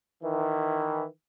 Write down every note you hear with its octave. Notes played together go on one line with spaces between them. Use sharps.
D#3 E3